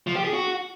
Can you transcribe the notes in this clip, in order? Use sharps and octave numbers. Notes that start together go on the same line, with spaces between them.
F3
G4
G#4
F#4